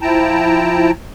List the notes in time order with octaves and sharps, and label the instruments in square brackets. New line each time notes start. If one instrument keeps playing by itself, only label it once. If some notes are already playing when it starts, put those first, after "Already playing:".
[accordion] F3 E4 G5 A5 A#5